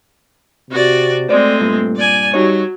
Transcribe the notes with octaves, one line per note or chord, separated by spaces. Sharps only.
C3 F#4 D5
G#3 A3 C4 C5 D5
G2 A#2
D5 G#5
F#3 G3 D#4 C#5